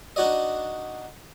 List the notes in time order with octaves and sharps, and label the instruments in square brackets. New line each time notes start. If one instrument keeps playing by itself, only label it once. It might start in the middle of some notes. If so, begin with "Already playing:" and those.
[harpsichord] D4 D#4 F#4 D5 D#5